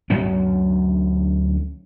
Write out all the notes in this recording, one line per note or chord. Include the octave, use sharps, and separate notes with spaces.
D2 F#3 B3 C#4